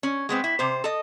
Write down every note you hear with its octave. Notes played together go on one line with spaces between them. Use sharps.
C#4
G#3 B3 C4
E4
C3 C5
A4 D#5